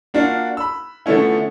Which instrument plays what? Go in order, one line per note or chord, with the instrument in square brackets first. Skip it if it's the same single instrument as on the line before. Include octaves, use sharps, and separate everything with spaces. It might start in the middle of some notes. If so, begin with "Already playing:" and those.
[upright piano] A#3 D4 F4 F#4
B5 E6
D3 F3 A3 B3 C#4 E4